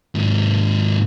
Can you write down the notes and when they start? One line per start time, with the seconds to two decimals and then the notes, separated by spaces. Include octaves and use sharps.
0.15 D#2 G#2